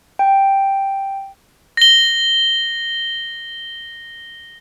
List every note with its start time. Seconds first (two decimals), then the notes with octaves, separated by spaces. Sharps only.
0.19 G5
1.77 A#6 G7